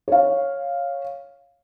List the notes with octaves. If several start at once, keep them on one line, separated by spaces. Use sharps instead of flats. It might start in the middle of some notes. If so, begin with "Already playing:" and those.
C#5 F5